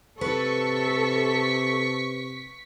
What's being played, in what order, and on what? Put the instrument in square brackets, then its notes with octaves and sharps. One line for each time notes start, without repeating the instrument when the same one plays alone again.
[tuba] C3 [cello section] A4 [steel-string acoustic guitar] B4 [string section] C#6 B6